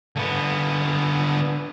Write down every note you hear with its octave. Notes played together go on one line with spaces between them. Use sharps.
D3 B3